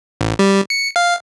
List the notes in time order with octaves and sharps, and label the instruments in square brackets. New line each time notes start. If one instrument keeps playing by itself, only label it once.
[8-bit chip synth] A1
G3
C#7
F5